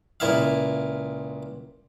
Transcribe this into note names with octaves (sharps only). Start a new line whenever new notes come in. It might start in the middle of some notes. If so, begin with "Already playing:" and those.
C#2 A#2 E4 E5 F5